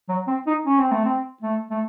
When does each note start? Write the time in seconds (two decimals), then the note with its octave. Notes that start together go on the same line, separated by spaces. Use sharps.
0.09 F#3
0.28 C4
0.47 D#4
0.66 C#4
0.79 C4
0.92 A3
1.05 C4
1.42 A3
1.70 A3